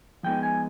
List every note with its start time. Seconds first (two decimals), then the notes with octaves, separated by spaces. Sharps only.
0.23 F3 G#3 B3 D#4 G5
0.43 G#5